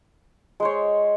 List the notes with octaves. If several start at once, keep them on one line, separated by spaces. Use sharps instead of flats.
G#3 C5 C#5